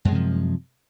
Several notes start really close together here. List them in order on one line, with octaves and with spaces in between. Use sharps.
F#2 G#3 C3 F3